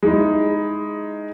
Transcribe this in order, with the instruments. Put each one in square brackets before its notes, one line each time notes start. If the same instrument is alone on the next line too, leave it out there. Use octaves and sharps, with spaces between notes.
[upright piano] G#3 D#4 E4